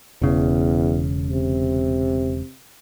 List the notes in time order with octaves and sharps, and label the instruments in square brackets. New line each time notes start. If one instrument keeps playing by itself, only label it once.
[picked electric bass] E1 C#3 [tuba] E2
[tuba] C3